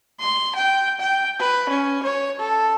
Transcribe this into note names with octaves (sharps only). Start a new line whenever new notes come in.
C6
G5
G5
B4
C#4
C#5
A4